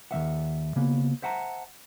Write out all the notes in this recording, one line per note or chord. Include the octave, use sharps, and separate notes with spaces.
D#2 F#3 E5 F#5
C#3 A#3 B3
C5 E5 F#5 A5 A#5